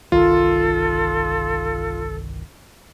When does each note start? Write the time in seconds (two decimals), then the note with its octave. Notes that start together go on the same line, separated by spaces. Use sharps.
0.12 G1 C2 D#3 F4 A4